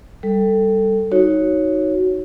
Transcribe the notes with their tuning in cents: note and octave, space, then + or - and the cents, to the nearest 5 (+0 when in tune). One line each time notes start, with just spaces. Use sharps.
G3 +0 A4 +15
D#4 +15 F#4 +5 C#5 +0